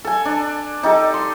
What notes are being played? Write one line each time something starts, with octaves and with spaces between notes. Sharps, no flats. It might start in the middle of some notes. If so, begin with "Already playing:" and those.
A4 G#5
D4
D#4 G4 A4
C6